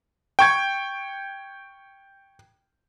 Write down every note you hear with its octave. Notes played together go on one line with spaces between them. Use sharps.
G5 C#6 G#6